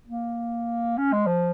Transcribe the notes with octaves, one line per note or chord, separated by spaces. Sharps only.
A#3
C#4
G#3
F3